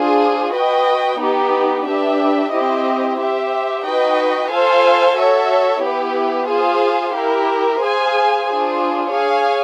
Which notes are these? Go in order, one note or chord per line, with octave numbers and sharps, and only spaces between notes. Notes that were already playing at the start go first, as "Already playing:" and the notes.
Already playing: D4 F4 G#4 C5
F#4 B4 D#5 G5
B3 D#4 G4 B4
D4 G4 B4 E5
C4 E4 G4 C5 D#5
G4 C5 E5
D#4 F#4 B4 D#5 G5
F4 A4 C5 F5 G#5
F#4 A4 C#5 E5
B3 E4 G4 B4
F4 G#4 C5 F5
E4 G4 A#4
G#4 C5 F5 G#5
D4 F4 G#4 C5
G#4 C#5 F5 G#5